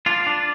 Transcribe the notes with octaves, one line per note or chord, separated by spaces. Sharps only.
D4 F4
D4